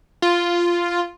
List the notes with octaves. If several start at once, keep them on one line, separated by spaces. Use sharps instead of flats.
F4